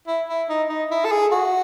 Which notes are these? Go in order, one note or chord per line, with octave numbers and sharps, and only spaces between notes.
E4
E4
D#4
D#4
E4
A4
G#4
F#4